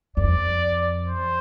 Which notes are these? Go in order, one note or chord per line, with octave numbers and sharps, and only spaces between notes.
F2 D5
C5